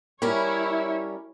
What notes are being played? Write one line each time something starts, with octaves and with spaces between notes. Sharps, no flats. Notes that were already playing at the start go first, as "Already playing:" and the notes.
G3 C#4 E4 A#4 C#5